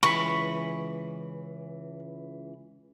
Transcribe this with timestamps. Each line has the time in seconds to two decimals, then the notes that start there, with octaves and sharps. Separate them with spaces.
0.03 C#2 E3 B5 C#6